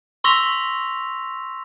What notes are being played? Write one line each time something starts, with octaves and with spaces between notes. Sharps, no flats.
C6 C#6 E6 A#6 B6 F7